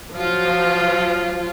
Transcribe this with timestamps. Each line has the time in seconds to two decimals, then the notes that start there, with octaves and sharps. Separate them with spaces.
0.16 F3 F#3 F4